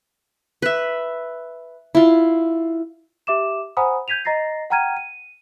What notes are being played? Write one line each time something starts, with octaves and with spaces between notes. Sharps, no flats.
B4 E5
E4 F4
G4 E5 D6 E7
C5 F#5 G#5 A#5 B5 D#6
G6 G#6 B6 D#7 F7
D#5 A#5 A6 A#6 C7
F#5 G5 A#5 F6 G#6 D#7
D#7